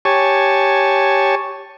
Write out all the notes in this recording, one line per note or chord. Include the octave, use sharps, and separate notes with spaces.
G4 C#5 G#5 A5 C#6